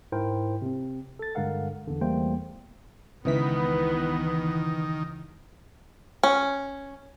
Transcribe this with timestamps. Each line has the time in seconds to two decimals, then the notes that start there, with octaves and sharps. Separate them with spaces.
0.12 G#2 E4 A#4 C5 G5
0.62 C3 C4
1.19 A4 A6
1.35 G2 D3 G#3 A#4 F5 F#5
1.87 E2 D3
2.01 E2 G3 A3 A#3 C5 G5
3.25 C#2 D#3 E3 B3 B6
6.23 C#4